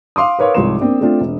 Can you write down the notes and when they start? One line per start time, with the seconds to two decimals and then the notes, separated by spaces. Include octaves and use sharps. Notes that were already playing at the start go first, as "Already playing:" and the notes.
0.16 F5 C6 D6 D#6
0.39 A#4 B4 C#5 F5 C6
0.55 C2 G#2 F3 C#5 C6 E7
0.81 A#3 C4 D4
1.01 A3 C4 D4 F4
1.20 E1